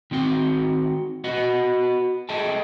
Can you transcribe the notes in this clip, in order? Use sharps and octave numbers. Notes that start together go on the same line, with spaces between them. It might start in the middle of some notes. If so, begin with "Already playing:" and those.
D#3 C4 F#4 G5
B3 F#4 D#5 F#5
G#4 A4 D#5 E5 G5 A5